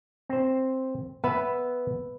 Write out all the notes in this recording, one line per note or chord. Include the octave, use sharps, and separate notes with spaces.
C4 C5
B3 B4 E5 F#5